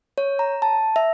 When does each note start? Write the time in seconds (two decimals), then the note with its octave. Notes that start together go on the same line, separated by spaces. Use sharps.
0.18 C#5
0.39 A#5
0.62 A5
0.96 E5